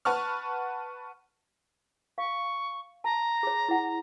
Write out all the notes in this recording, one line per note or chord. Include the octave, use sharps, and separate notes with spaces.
B4 F#5 A5 C#6 F6
F5 C#6
A5 A#5
G#4 C#5
E4 G#4 F#5